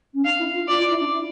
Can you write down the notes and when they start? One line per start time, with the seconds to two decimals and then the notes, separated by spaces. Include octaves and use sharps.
0.14 C#4
0.24 D4 F5
0.39 E4
0.54 F4
0.68 F4 D5
0.79 F4
0.90 E4
1.00 D4
1.12 E4